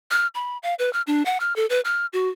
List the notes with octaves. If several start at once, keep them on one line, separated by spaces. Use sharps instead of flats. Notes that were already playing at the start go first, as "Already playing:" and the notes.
F6
B5
F5
B4
F6
D4
F#5
F6
A4
B4
F6
F#4